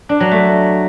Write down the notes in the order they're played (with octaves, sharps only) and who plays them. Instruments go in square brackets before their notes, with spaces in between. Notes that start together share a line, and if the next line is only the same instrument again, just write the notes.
[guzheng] D4
F#3
A3